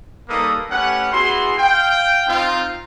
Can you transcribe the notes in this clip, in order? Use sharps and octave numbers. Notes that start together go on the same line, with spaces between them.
G3 A#3 D#4 A4 B4 D#6
A3 C#4 G4 B4 F#5
B3 E4 F#4 G#4 C6
F5 G5
C4 D#4 F4